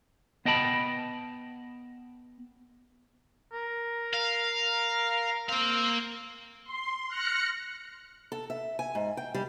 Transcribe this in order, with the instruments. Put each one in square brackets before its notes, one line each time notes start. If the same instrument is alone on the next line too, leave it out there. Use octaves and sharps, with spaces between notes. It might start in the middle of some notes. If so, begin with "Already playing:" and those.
[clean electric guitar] B3 D#5 G5 A5 B5
[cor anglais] A#4
[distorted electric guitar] F5
[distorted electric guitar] A#3 F5 [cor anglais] C4
[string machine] C6
F6 F#6 A#6 C#7
[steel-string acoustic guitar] A4
E5
G#5
G#2
G5
G3